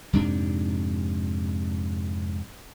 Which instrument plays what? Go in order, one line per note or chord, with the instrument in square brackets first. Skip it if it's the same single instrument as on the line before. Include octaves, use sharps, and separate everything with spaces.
[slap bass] F2 G#2 C3 D4